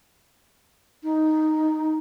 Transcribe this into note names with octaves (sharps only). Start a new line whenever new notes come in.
D#4